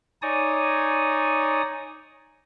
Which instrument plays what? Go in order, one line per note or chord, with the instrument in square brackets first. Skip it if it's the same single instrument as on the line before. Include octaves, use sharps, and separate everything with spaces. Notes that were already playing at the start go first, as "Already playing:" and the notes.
[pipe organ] D#4 C#5 D5 G#5 D#6